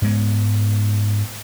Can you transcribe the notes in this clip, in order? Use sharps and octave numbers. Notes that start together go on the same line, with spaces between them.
G#2 G#3 B3